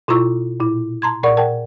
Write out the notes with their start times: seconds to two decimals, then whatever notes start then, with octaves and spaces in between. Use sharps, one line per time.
0.08 B2 E4 F4 A#5 C#6 E6
0.60 A#2 E4
1.02 A5 A#5 C6 G#6
1.23 A#2 A#4 D5 F#5 C#6
1.37 A#4 F#5 G5 A5